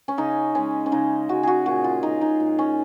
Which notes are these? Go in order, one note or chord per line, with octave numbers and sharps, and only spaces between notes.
C#4
C#3 D#4
G#3 C#4
C#4
C#3 D#4
G#3 F#4
F#4 G#4
A#2 F#4
F4
G#3 D#4
D#4
A#2
C#4